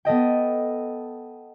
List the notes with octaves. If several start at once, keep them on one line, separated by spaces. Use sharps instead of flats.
B3 A4 D#5 G5